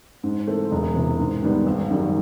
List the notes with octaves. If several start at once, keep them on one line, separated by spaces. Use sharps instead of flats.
G#2
E3 A3 C4
E1
E2 C3 E3
G#2
D#3 G3 B3
G#1
F#2 D#3 G3